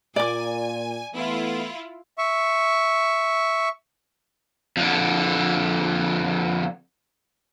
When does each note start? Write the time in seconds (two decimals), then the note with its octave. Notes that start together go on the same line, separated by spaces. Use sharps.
0.16 A#2 D5 G#5 D6
1.15 E3 A3 B3 E4 F4
2.18 E5 C#6
4.77 F2 D3